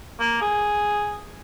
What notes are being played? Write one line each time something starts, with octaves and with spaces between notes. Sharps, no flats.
A#3
G#4